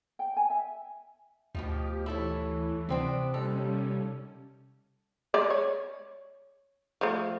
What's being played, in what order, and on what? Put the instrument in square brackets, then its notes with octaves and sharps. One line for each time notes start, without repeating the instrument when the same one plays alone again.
[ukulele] G5
G#5
E5
[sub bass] D2 [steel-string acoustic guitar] B2 D#3 F3 [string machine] G4
[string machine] E3 [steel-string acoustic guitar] E4 A4 C#5
[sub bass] C3 [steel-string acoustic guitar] B3 C4 D4
[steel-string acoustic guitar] D#2 A#2 A4 [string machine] G3 C#4
[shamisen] G#3 D5
C#5
F3 A3